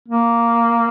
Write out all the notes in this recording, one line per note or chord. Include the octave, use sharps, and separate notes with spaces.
A#3